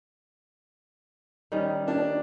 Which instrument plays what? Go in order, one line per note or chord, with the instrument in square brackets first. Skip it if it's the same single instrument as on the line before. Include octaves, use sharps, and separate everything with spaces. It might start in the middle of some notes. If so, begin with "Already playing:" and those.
[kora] D#3 G3 C#4
[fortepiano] A#3 D4